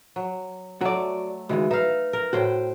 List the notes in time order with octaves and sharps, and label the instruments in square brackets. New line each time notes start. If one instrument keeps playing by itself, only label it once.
[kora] F#3
[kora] F#3 A3 [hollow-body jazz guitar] F#4 D5
[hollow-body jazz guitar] C#2 D#3 G#3 [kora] E3 [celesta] F#4 E5
[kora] D#4 F5 [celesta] B4 [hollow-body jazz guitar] E5
[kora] A#4
[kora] A2 C5 G5 [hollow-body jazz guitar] F#4